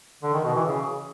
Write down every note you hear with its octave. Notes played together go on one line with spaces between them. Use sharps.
D3
D#3
B2
E3
C#3